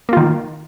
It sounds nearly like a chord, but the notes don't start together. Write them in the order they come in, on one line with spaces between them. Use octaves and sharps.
A#3 F4 D#3